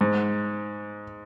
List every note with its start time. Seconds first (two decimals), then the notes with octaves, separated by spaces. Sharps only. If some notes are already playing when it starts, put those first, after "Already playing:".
0.01 G#2